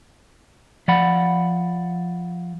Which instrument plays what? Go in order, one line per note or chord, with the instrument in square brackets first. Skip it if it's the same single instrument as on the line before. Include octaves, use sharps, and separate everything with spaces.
[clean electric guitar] F3 D5 F#5 B5